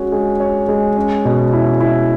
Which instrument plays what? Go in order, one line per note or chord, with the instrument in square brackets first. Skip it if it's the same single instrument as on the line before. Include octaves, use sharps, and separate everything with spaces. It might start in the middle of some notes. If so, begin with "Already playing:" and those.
Already playing: [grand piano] G#3 C#4 F#4 C#5
G#3
C#5
G#3
C#4
B2
E4
E4